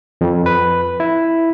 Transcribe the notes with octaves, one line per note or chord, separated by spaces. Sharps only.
F2
B4
E4